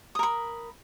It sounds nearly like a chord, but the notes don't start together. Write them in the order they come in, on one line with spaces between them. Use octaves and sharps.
D#6 A#4 B5